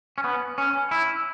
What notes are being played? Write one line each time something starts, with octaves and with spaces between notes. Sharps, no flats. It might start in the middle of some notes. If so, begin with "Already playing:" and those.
C#4
B3
C#4
E4